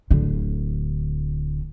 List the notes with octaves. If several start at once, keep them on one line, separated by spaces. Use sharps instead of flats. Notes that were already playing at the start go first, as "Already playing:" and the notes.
D1 D3